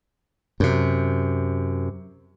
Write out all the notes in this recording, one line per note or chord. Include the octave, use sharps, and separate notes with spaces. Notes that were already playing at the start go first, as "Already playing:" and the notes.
F#2 C3